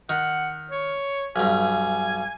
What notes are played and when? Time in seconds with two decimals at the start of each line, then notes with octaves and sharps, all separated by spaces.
0.09 D#3 F#5
0.71 C#5
1.36 B1 G2 G#5